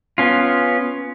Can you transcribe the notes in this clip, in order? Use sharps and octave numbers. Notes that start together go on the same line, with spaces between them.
B3 C#4 F4